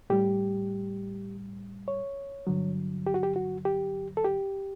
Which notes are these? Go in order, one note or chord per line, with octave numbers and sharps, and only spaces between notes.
A2 G3 G4
C#5
G2 D3 F#3
G4
F#4
G4
F#4
G4
A4
G4